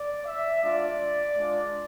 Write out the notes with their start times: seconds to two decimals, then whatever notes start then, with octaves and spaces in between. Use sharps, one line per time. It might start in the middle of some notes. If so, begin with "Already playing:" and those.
Already playing: D5
0.26 E5
0.62 G#3 D4 F4 D5
1.36 G#3 D4 F4